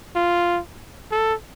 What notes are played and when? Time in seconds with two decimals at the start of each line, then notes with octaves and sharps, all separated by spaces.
0.16 F4
1.12 A4